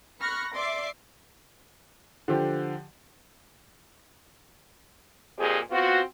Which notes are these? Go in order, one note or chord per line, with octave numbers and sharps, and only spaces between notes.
B5 C#6 F6 F#6 A#6 C#7
D5 E5 C6 D6 C7
D3 F3 G4
F2 A#2 G4 G#4
B3 C4 F4 F#4